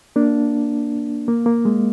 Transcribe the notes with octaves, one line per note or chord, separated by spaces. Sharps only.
A#3 D4
A#3
A#3
G#3